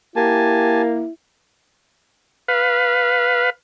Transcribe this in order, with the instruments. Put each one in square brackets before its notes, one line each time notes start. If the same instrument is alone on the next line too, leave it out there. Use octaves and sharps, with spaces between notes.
[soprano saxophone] A#3 [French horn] E4 [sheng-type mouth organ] G4 G#5 A5
[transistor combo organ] B4 F5